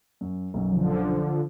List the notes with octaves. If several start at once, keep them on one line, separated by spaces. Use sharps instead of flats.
F#2
B1 F#2
D3 F3